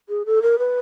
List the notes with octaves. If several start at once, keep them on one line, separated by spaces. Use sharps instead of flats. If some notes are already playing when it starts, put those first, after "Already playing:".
G#4
A4
A#4
B4